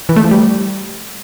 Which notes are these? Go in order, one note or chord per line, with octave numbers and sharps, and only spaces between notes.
E3
A3
F3
G3